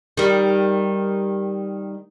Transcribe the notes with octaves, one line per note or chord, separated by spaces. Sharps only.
D#3 G3